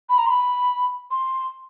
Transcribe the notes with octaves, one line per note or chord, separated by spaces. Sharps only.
B5
A#5
C6
B5
C6